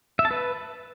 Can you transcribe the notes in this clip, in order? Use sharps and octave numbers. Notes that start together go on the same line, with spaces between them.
E5
A5
B4